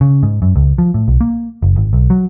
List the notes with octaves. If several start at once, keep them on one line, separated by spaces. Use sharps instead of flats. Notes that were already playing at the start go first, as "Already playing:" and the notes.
C#3
G#2
F#2
C#2
F3
A2
B1
A#3
F#1
G#1
B1
F#3